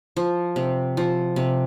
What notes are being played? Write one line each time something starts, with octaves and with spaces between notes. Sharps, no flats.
F3
C3
F3
C3